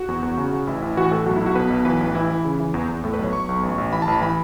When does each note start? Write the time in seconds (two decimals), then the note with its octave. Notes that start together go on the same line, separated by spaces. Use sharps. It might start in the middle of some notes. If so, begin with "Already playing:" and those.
Already playing: F#4
0.08 E2
0.23 E2
0.37 C#3
0.53 C#3
0.67 A1 E4
0.82 A1 E4
0.97 E3 F#4
1.11 A2 A4
1.26 B1 F#4
1.36 E4
1.41 B1
1.46 F#4
1.55 B2 B4
1.70 B1
1.85 E3 B4
2.01 A1
2.15 E3 E4
2.31 E3
2.45 C#3
2.60 E3
2.74 E2
2.89 E2
3.04 A2 A4
3.13 B4
3.19 B1
3.24 C#5
3.33 B1 C#6
3.49 B1
3.63 A1
3.78 A1
3.93 E3 B5
4.02 A5
4.07 A1 B5
4.22 E3 B5